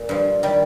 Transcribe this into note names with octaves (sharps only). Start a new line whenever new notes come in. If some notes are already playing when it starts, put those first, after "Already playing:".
Already playing: A#2
G2 F3
D#3 G3